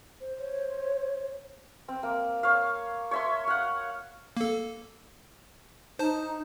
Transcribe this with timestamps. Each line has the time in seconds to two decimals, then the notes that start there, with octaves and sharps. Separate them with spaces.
0.21 C5
0.39 C#5
1.88 C4
2.03 A#3
2.43 C#5 F5
3.11 C#5 E5 C6
3.48 F5 F#5
4.37 A#3 A4
5.99 D#4 C5 A5